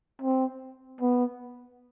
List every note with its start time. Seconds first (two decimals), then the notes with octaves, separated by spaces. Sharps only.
0.22 C4
1.01 B3